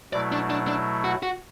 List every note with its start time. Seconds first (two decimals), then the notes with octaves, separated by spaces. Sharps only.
0.13 B2 F#3 A3 E4 D5
0.32 D4
0.50 D4
0.67 D4
1.04 F#4
1.23 F#4